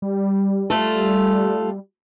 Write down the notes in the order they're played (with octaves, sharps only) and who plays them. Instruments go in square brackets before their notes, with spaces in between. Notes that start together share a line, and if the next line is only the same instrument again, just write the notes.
[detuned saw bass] G3
[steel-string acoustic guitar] A3 F4 A4